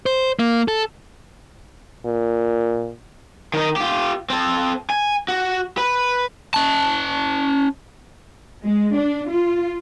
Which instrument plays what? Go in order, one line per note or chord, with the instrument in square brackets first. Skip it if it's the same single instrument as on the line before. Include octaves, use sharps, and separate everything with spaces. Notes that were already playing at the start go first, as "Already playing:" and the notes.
[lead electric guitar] C5
A#3
A4
[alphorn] A#2
[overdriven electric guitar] D#3 D#4
F4 G4
C4 A4
G#5
F#4
B4
C#4 A5
[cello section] G#3
D4
F4